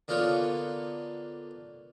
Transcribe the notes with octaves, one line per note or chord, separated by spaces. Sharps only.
D3 A#3 B3 F4 C#5